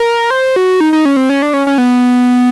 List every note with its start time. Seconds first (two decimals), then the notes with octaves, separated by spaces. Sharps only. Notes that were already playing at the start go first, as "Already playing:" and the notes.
Already playing: A#4
0.30 C5
0.56 F#4
0.80 D#4
0.93 D#4
1.05 C#4
1.17 C4
1.29 C#4
1.42 D4
1.54 C#4
1.67 C#4
1.78 B3